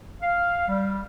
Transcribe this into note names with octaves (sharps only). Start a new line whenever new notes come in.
F5
G3